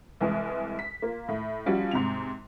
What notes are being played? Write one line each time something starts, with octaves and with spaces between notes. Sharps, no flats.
C2 E3 G#3
B6
A#3 F4
A2
F3 G3 C#4 F4 F#4
G#2 C3 F7